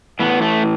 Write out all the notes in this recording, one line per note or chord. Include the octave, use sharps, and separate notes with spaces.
A2 E3 B3
A3